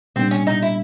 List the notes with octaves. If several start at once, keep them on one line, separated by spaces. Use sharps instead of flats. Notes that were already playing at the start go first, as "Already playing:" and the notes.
A#2 G3 B3 C4 D4
C#4
D#4
E4